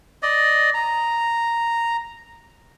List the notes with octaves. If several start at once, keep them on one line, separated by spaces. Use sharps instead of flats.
D5 D#5
A#5